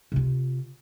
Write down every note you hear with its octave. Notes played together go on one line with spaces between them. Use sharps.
C3 F4